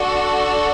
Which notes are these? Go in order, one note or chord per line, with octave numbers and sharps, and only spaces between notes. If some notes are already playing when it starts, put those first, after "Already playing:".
Already playing: D4 F#4 A4